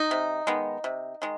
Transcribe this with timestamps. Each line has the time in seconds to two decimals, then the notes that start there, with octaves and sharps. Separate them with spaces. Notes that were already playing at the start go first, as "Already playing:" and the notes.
Already playing: D#4
0.11 C3
0.47 D#3 G#3 B3
0.84 C3
1.22 D#3 G#3